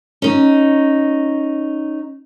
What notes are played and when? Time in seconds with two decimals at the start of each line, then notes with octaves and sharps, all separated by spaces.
0.22 C#4 D#4